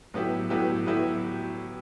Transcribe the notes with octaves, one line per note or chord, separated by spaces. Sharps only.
A2 F#3 B3 E4 G4
A2 F#3 B3 E4 G4
A2 F#3 B3 E4 G4